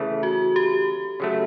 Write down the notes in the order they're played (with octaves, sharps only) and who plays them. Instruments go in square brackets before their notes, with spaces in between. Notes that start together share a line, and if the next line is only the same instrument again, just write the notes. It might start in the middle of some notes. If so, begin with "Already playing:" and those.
Already playing: [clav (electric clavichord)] C#3 E3 A3
[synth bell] F#4
G4
[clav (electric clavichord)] C#3 F#3 A3